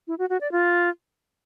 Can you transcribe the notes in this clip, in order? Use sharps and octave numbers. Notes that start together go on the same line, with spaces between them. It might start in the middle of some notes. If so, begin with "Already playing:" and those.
E4
F#4
F#4
D5
F4